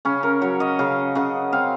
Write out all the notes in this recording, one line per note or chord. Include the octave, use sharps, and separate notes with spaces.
C#3 C#4
A#4
F#3 C#5
D#5
C#3 F5
C#3 F#5
C4 F5